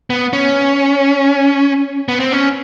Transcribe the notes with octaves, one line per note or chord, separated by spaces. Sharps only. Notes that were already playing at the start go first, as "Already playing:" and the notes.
B3
C#4
B3
C4
C#4